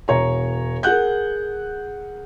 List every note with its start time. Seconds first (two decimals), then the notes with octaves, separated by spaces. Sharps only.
0.08 E1 C#5 A#5
0.83 G#4 A#4 F#5 F#6 G6